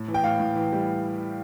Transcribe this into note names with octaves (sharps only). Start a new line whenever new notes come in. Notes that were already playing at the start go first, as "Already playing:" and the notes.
Already playing: A2
E3
G5
A2 F5
A2
E3
G3